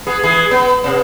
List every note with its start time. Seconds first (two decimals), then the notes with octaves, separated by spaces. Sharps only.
0.07 B3 G#4
0.24 E3 G#4
0.51 B3
0.84 C3 B3